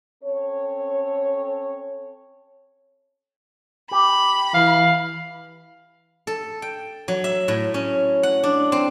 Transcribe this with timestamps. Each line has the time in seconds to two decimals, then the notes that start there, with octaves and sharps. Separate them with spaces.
0.23 C4 C#4 A4 C#5
3.91 G4 B5
4.54 E3 F5
6.27 A4
6.62 G5
7.08 F#3
7.24 E5
7.48 A2
7.74 C#4
8.23 F#5
8.43 D4
8.72 C4